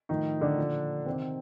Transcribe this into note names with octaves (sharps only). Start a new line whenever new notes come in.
A2 D#3 F3 D#4
D3 D4
A#2 F3
C3 D#3 C4